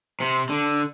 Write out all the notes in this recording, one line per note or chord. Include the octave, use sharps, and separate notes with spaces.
C3
D3